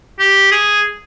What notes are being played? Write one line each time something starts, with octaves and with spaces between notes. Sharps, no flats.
G4
G#4